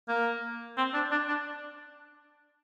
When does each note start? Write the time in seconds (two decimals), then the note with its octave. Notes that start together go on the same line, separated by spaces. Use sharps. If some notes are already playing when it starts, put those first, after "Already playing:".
0.08 A#3
0.77 C4
0.94 D4
1.11 D4
1.28 D4